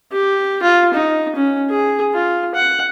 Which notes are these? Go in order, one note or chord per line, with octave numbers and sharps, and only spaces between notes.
G4
F4
D#4
C#4
G#4
F4
F#5